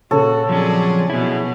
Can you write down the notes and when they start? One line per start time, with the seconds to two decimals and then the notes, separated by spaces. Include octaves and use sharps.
0.11 A#2 C#3 F#4 A4 C#5
0.49 F3 F#3 C4 C#4 G#4 D5
1.10 B2 B3 E4 G#4